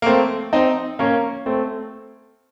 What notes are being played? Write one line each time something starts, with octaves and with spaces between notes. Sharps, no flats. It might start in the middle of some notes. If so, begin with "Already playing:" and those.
A#3
A3 C4
C4 D#4
A#3 C#4
A3 C4